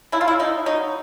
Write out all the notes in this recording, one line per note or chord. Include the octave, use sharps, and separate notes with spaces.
C#3 E4
F4
E4
A#3 D#4
F#3 D#4